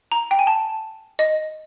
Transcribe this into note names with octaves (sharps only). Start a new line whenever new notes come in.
A#5
G5
G#5
A5
D#5